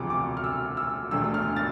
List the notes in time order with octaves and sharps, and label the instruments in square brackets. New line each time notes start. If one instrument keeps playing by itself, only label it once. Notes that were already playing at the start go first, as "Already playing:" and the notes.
Already playing: [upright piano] E1 D2 C3 F3 D6
D6
F6
E6
E6
E1 D2 D3 A3 E6
F6
A6